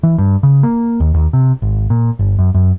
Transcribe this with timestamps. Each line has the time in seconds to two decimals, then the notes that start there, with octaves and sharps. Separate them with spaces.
0.03 E3
0.18 G2
0.43 C#3
0.63 A#3
1.00 D#2
1.14 D#2
1.33 C3
1.62 G#1
1.90 A#2
2.19 G1
2.39 F#2
2.55 F#2